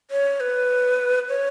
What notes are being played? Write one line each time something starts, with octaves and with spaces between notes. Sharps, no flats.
C#5
B4
C#5